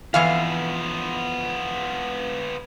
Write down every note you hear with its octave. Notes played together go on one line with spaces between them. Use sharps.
F2 E3 B3 F4 F5